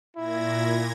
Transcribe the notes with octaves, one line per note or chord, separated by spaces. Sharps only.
A#2 E4 G#6 A#6